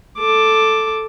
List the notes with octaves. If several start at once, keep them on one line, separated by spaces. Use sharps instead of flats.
A4 D6